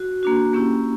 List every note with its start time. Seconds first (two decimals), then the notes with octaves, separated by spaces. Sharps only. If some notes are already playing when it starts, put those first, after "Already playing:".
Already playing: F#4
0.23 A#3 D4 F#4
0.53 A#3 C#4 E4 G4